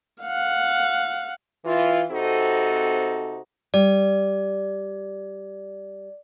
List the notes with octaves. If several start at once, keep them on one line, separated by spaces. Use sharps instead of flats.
F5 F#5
E3 F4
C3 C4 D#4 F#4 A4
G3 D5